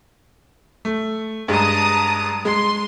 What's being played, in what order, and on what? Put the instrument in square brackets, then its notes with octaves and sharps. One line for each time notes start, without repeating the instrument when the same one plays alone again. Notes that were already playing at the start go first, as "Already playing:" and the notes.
[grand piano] A3
[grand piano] G2 G#3 [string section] A5 A#5 D#6
[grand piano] G#3 [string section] C6